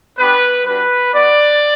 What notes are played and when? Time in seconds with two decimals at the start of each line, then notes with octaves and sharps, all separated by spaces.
0.17 B3 D4 G4 B4
0.65 G3 D4 F#4 B4
1.14 B3 F#4 D5